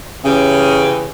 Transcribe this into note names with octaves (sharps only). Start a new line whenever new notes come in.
C#3 E3 C#4 G4